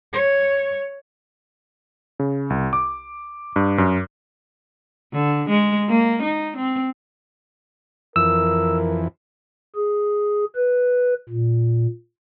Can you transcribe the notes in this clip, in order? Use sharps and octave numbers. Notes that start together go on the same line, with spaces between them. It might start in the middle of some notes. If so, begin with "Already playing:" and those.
C#5
C#3
C2
D6
G2
F#2
D3
G#3
A#3
D#4
C4
F2 E3 A#4 E6
G#4
B4
A#2